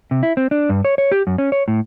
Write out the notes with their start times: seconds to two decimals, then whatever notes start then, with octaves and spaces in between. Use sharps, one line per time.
0.11 C3
0.23 E4
0.37 C4
0.51 D4
0.69 G2
0.85 C#5
0.98 C#5
1.12 G4
1.27 F#2
1.38 C#4
1.52 C#5
1.68 A2